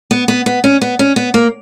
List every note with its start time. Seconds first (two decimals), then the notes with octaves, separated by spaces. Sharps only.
0.11 B3
0.28 B3
0.46 B3
0.64 C#4
0.81 B3
0.99 C#4
1.16 B3
1.34 A#3